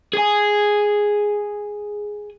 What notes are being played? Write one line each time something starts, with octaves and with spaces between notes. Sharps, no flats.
G#4 G#5